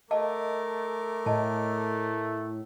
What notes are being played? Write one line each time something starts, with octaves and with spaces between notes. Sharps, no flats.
A3 A#4 D#5 F5 A5 D6
A2 D#5 A5